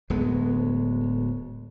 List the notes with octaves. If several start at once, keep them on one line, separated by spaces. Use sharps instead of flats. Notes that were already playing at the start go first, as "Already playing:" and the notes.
D1 D2 G#3 B3